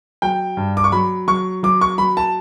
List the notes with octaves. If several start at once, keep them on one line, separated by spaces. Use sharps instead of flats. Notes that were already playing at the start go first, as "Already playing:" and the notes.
F#3 G5
G2
D6
C#6
F#3 B5
F#3 C#6
F#3 D6
C#6
F#3 B5
A5